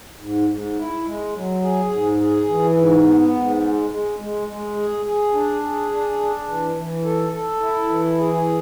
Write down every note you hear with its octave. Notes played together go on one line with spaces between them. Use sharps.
G#2
G#2
E4
G#3
F#3
G#4
G#2
G#4
E3
G#2
B3
G#2
G#3
G#3
G#3
G#3
G#4
G#4
D4
G#4
D4
D4
E3
E3
A4
A4
E4
E3
G#4